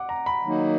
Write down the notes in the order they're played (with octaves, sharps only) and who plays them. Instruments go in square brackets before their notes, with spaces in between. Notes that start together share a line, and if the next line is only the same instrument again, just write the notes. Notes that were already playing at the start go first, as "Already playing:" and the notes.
Already playing: [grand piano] F#5 D6
A#5
B5
[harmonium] D#3 F#3 A#3 D#4